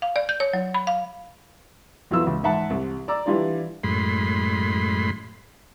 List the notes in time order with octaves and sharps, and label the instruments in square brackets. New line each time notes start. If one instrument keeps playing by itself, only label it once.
[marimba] F5
D5
G6
C#5
F#3
B5
F5
[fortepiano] B1 F2 E3 F#3 F4 E6
C#2
G#2 E5 F#5 A5
C2
D5 A#5 D6 E6
E3 G3 D4 F4 D5
[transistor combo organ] F#2 A2 G#3 B5 C6